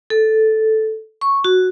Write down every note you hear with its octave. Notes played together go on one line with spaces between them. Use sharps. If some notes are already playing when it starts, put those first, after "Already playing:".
A4
C#6
F#4